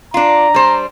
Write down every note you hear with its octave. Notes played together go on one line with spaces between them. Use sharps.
D4 F4 A#5
G3 C5